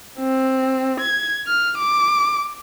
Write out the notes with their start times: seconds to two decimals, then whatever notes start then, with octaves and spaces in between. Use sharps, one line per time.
0.19 C4
1.00 G#6
1.47 F6
1.79 D6